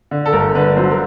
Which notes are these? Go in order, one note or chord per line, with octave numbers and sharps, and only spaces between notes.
D3
A4
G1 A#4
D3 B4
F#3 C5
A#4